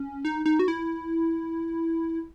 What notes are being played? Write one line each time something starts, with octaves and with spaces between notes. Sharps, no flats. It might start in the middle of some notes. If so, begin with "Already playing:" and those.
Already playing: C#4
D#4
D#4
F#4
E4